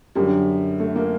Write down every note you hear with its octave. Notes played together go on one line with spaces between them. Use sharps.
F#2 D3 G3
A3
A#3